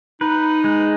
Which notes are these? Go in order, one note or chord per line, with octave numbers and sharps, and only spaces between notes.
D#4 B4
G#3